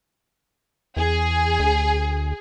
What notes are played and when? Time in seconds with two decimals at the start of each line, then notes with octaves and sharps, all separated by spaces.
0.97 E2 G#4
1.60 D2